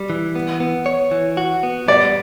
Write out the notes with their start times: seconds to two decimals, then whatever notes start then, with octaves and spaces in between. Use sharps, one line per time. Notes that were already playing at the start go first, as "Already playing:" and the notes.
Already playing: G3
0.10 E3
0.36 B3
0.60 B3
0.86 C#5
1.11 E3
1.37 F#4
1.63 B3
1.88 G3 D5